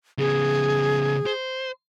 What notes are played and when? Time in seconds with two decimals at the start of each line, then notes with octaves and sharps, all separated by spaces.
0.19 C#3 B3 G#4
1.26 C5